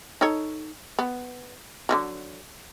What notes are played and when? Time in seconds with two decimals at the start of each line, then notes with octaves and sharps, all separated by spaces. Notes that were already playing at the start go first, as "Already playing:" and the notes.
0.21 D#4 A4 C#5
0.99 B3
1.89 D3 E3 F#3